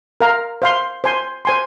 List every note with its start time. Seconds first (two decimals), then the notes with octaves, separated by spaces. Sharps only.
0.21 A#4 F5 A#5
0.62 C5 F5 C6
1.04 C5 G#5 C6
1.45 C5 G#5 C6